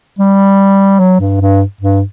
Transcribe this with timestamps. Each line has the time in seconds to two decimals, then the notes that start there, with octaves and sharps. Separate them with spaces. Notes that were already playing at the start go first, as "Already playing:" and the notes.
0.19 G3
0.99 F#3
1.20 G2
1.41 G2
1.81 G2